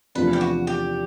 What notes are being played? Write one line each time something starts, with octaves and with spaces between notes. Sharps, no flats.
E2 C3 F3 A3 D4 B4
G4
F#4
G4